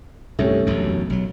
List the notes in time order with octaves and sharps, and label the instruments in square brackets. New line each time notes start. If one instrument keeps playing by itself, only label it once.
[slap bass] C2 G2 [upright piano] A3 C#4 G4
[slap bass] E1 B1 F#2
B1 F#3